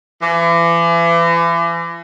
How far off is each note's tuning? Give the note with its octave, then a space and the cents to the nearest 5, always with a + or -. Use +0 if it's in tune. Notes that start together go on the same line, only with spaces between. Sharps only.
E3 +40